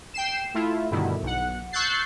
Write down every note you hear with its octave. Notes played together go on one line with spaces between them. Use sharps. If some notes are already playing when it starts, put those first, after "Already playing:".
G5 C7 E7
A3 E4 F4
G2 B2 D3 D#3 E4
B1 F#5
C#6 E6 F#6 G6 A6 C7